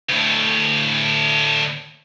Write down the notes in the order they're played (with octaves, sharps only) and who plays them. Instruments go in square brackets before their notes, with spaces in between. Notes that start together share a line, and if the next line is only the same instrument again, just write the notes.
[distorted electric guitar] D2 A2